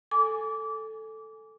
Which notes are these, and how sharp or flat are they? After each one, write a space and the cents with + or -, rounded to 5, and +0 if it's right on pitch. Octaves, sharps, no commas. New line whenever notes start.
A4 +0 G#5 +0 D6 -25